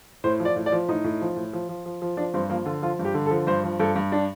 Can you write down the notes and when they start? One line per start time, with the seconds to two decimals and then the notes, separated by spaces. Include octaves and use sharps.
0.24 A2 C5
0.40 F3
0.45 D5
0.56 A2
0.66 D5
0.72 F3
0.88 A2 D#4
1.04 A2
1.21 F3
1.36 A2
1.53 F3
1.69 F3
1.86 F3
2.02 F3
2.17 F3 D4
2.34 G2 C4
2.50 F3 A#3
2.66 D3 F4
2.82 F3 F4
2.99 G2
3.05 G4
3.14 D3
3.26 A4
3.31 F3
3.47 G2 C5
3.64 F3
3.79 G2 A4
3.96 G2
4.12 D4